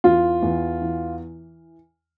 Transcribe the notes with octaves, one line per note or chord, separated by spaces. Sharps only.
E2 F4
E2
E3